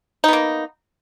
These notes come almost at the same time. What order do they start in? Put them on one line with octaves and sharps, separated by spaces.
D#4 B3 A#3